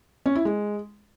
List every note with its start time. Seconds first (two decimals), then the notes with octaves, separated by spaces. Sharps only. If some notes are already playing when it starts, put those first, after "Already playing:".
0.26 C#4
0.35 E4
0.45 G#3